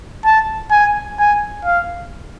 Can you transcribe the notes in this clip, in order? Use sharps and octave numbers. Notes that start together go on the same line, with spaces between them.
A5
G#5
G#5
F5